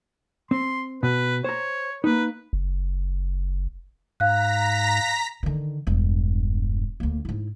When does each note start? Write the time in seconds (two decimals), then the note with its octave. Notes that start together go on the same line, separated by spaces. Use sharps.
0.51 C4 C6
1.03 B2 B4
1.44 C5 C#5 A#5
2.04 A#3 D#4 B4
2.53 F#1
4.20 G#2 F5 A#5 F#6 A#6 B6
5.43 D3 D#3
5.87 E1 G2
7.00 D2 A#3
7.25 G#2 E4